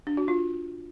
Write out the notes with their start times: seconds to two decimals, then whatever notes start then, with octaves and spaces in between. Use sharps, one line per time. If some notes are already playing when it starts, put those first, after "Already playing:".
0.07 D4
0.17 F#4
0.28 F4